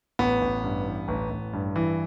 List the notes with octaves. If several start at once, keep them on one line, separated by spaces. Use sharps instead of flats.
A1 B3
A1
G2
E3
A1
A1
G2
E3